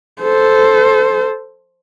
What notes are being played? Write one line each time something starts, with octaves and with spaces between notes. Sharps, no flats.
A4 C5